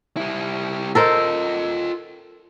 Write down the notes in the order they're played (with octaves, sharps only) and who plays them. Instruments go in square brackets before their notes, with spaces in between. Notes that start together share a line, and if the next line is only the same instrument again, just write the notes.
[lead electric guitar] G3 E4
[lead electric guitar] F4 D#5 [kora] A4 A#4 C5